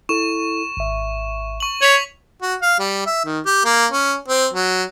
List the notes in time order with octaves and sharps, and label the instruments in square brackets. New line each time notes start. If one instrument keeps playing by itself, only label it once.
[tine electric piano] E4 A4 [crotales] C#6 E7
[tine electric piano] G#1 E5
[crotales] C#6 F#7
[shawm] C#5 [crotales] B6 F7 F#7
[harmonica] F#4
F5
G3
E5
D#3
G4
A#3
C#4
C4
F#3